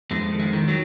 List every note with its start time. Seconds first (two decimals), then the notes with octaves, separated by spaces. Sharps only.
0.11 F2 G#3
0.32 D#3
0.40 G#3
0.53 D#3
0.68 F#3